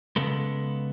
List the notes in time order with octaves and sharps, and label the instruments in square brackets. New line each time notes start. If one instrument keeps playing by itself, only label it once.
[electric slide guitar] C#3 G#3 B3 A4